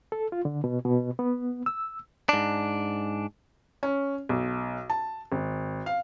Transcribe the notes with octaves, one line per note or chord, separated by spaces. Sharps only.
A4
F4
D3
B2
B2
B3
E6
G#2 D4
C#4
B1
A5
G#1
F5